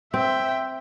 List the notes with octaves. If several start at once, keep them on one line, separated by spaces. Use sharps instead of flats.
C4 E5 G5